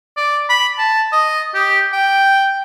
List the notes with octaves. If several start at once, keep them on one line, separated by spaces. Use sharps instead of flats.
D5
B5
A5
D#5
G4
G5